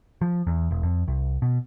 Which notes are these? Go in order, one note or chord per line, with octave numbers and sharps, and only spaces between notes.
F3
E2
E1
F2
C2
B2